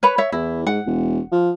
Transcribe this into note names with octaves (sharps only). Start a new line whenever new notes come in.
B4 C#5 B5
C#5 E5
E2 E4
G#2 F#5
E1
F3